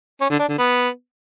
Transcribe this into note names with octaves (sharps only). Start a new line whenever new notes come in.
C#4
D3
D4
D3
B3